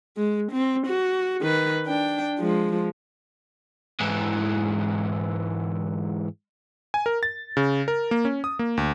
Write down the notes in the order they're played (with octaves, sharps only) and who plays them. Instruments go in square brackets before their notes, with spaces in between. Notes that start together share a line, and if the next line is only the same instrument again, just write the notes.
[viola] G#3
C4
F#4
D#3 B4
D4 G5
F3 G#3
[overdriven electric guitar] G#2 E3
[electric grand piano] G#5
A#4
A6
C#3
A#4
A#3
C#4
D#6
A#3
D2